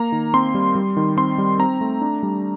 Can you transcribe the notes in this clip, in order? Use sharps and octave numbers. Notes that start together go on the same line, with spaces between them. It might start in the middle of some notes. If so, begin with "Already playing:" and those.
Already playing: A#3 A#5
D#3
C4 C6
G3
G3
D#3
C4 C6
G3
C4 A#5
A3
D4
G3